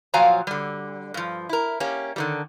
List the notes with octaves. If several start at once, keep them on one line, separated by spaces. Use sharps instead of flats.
A#2 F3 F#3 F5 G#5 A#5
D3 G3
G2 F3
E4 A#4
A#3 C#4 G4
D3 D#3 G3